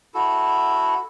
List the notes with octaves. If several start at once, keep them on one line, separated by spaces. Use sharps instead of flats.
E4 F#4 A4